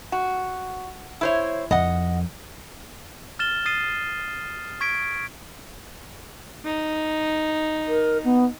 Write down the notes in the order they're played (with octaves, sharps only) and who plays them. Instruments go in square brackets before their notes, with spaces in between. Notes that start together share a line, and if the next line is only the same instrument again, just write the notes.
[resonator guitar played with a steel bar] F#4
E4 C5 C#5
[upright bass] F2 [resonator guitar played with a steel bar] D#5 F#5
[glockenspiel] F6 A6 E7 G7
D#6 A6 C7 D#7
C#6 G#6 B6 D7
[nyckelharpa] D#4
[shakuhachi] A#4
B3